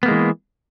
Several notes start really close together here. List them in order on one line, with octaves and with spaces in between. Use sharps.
B3 A#3 G#3 E3